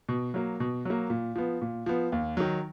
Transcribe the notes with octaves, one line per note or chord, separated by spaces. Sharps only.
B2
F#3 A#3
B2
F#3 A#3
A#2
F3 B3
A#2
F3 B3
D#2
D#3 F#3